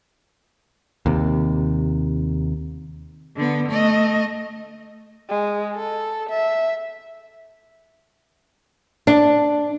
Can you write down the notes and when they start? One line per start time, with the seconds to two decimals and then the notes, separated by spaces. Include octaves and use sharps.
1.06 D#2 C3
3.36 D3 B3
3.68 A3 D#5
5.29 G#3
5.75 A4
6.30 E5
9.07 D4